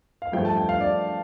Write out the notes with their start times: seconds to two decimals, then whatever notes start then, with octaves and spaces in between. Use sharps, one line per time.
0.22 F5
0.32 G2 F3 A3 G5
0.45 A5
0.57 G5
0.69 F5
0.81 D5